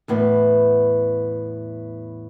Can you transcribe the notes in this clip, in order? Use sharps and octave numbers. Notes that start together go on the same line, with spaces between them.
E2 A2 B3